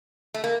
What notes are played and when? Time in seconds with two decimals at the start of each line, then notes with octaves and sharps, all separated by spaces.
0.34 A3
0.44 A#3